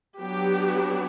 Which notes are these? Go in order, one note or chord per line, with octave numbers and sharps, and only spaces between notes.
F#3 B3 D4 G4